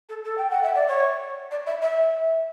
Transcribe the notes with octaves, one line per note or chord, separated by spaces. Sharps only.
A4
A4
G5
F#5
E5
D5
C#5
D5
E5
E5